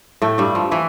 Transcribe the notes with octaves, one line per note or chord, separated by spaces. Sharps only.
A2 A3
G2 G3
F3
E3 E4